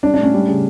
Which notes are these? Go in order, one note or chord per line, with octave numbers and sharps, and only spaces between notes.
G3 D4
D4
A2 C#4
G3
C#3